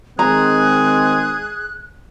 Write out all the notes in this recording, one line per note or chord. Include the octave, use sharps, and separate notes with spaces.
D#3 G#3 C4 G#4 A#5 F#6